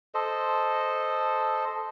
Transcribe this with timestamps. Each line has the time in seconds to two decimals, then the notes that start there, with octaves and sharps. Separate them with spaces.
0.14 A4 C5 D#5